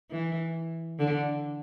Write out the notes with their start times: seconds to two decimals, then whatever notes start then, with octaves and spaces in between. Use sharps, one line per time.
0.10 E3
0.99 D3